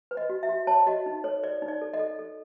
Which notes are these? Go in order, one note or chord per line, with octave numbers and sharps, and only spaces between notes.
B4
D#5
F#4
E5
F#4
C#5 A5
F#4 D#5
D#4
A4 C#5
C#5 D5
D#4
D5
A4
D#5
A4
A4